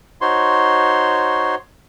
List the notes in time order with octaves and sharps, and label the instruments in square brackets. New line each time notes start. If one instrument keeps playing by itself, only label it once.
[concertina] D#4 F#4 C5 C#5 C6